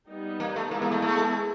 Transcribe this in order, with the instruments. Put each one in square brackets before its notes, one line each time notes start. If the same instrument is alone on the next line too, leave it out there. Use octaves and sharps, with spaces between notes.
[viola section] G3 B3 D#4
[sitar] A#3
A3
[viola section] G#3 B3 E4 G#4 [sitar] A#3
[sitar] A#3
A3
A3